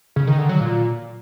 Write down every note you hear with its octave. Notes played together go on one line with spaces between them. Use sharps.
C#3
D#3
D3
F#3
A#2